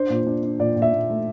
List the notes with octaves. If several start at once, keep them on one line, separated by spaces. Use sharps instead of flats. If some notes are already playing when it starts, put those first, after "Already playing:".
Already playing: D4 C5
A#2
D4
D4
A#2 D5
A#2
E5
A#2
A3